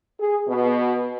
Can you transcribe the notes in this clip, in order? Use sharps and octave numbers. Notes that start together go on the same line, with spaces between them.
G#4
B2